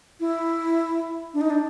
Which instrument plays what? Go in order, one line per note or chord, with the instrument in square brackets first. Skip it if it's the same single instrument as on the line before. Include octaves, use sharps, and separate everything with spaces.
[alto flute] E4
D4
D#4
D4